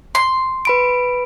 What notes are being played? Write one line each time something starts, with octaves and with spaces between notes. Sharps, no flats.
C6
B4 B5 D7